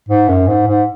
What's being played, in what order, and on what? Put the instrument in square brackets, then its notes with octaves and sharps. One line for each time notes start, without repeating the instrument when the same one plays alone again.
[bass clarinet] G#2
F#2
G#2
G#2